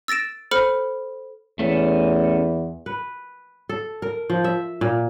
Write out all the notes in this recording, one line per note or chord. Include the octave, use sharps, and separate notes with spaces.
E6 A6 A#6 D7 E7
A4 C5 B5 F6 C#7
E2 A3 C#4
B4
A4
A#4
F3
E5
A#2